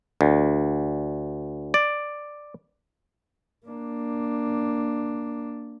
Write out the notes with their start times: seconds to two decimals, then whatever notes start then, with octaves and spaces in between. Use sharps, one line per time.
0.21 D2
1.74 D5
3.67 A#3 D4